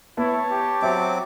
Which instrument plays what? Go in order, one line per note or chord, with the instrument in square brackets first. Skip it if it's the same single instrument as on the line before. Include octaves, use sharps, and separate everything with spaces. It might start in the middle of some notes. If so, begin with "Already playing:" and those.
[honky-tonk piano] B3 [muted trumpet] E4 [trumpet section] C#5 A5
[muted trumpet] G4
[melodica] F#3 C4 D6 [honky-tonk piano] E5